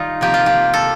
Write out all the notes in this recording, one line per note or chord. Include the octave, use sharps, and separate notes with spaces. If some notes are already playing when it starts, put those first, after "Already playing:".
Already playing: D#3 G3 D#4 F4
C3 F3 A#3 G4
F4
G4
A4